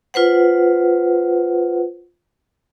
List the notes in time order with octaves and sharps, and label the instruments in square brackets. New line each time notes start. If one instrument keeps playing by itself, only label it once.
[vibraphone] F4 B4 C5 F#5